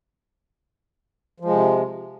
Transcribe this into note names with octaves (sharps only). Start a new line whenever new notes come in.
C3 F3 G#3